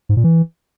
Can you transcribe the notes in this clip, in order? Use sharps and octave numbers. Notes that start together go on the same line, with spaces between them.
G#2
A#2
E3